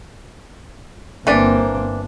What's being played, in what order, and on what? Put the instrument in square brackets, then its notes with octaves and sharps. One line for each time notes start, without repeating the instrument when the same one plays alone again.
[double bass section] G1 A#3 C4 [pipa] E3 D4